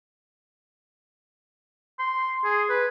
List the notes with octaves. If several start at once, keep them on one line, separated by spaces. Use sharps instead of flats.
C6
G#4
B4